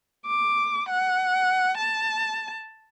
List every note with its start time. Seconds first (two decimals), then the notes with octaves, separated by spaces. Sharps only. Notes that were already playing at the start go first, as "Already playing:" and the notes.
0.26 D6
0.89 F#5
1.78 A5